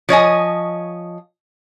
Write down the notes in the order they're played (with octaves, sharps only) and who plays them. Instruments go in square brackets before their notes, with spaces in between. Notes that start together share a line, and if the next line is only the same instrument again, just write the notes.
[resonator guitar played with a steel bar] F3 C#5 D#5 G#5